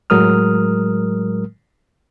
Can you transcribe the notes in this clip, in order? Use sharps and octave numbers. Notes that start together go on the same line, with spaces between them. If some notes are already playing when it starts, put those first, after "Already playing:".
A2 F#3 G#3 A#4 D#6 F6